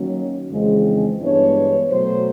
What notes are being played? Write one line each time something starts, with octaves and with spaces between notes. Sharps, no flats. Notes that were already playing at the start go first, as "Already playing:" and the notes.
Already playing: D#3 F#3 A#3 C#4
F2 C#3 E3 G#3 C4
G2 E3 G#3 B3 D4 C#5
B2 F#3 A3 C5